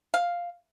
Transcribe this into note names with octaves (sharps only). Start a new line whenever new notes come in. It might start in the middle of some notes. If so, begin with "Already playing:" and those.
F5